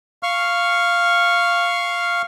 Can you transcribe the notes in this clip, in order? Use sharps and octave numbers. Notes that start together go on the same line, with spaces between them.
F5 C#6 F6